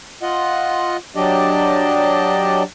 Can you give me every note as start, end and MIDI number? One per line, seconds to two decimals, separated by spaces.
0.22 0.97 65
0.22 0.97 75
0.22 0.97 78
1.16 2.63 54
1.16 2.63 62
1.16 2.63 67
1.16 2.63 74
1.16 2.63 75